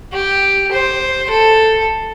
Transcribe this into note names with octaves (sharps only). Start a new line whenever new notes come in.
G4
C5
A4